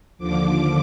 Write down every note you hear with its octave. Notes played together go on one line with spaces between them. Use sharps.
D#2 D3 F3 D6
D6